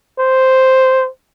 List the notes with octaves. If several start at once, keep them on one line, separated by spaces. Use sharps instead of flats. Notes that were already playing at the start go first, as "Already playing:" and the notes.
C5